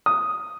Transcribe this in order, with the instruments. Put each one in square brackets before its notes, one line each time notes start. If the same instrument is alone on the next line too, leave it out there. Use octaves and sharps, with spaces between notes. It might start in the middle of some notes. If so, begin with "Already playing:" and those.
[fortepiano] D#6